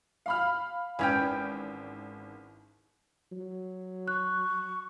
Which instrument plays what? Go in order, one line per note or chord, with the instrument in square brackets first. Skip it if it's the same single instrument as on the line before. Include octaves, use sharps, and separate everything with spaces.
[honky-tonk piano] F5 B5 F6
[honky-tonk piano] G#1 [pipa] E3 C#4 G5
[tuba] F#3
[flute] C#6 [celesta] F#6